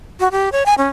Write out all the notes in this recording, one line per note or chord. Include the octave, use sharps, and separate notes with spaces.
F#4
G4
C#5
G#5
C#4